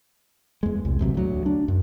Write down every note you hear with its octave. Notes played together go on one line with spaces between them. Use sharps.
E2 G#3
C2
A1 D#2 C3 F#3
D2 F#3
D4
F#2